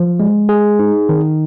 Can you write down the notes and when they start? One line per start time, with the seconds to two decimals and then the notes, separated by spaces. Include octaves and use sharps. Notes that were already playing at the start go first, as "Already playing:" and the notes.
Already playing: F3
0.20 G#3
0.49 G#4
0.79 D#4
1.09 D#3